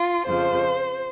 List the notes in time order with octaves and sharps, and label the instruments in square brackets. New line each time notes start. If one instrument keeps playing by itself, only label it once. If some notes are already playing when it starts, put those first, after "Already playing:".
Already playing: [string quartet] F4
F2 C#3 F3 C5